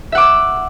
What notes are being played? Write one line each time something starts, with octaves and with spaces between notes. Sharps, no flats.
E5 F#5 D6 E6